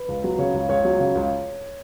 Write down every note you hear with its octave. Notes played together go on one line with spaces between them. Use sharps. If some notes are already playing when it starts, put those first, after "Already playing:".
Already playing: B4
C#2
F#3
C#3 C#5
C#2
C#2 C#5
F#3
C#3
C#2